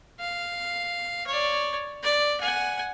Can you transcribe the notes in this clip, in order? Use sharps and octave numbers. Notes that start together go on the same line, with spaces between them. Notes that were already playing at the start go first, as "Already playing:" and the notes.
F5
C#5 D5
D5
F#5 G#5